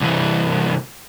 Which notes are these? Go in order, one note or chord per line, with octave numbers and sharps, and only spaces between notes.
C2 E3